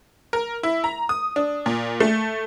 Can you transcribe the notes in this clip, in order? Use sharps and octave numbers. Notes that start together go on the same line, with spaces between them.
A#4
E4
A#5
D#6
D4
A#2
A3